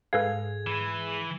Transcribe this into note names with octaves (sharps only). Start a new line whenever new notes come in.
G#2 G#4 A4 B4 F5 G#6
E3